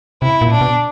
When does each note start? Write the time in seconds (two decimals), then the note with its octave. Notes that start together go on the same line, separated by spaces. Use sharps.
0.22 C3 E4
0.41 A#2
0.51 D4
0.61 B2